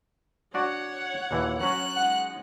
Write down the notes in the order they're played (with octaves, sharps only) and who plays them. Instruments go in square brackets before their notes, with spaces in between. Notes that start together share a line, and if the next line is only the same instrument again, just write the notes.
[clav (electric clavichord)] D4 F#4 D5 [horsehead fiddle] C#5 F#5
[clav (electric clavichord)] D#2 A#2 E3
[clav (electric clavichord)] F#3 C#4 F#4 [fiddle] F#6
[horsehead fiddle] G#3 D#4 [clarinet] F#5